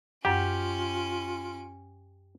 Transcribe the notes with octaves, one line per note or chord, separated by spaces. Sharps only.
F#2 C#4 F4 G4 F#5 D7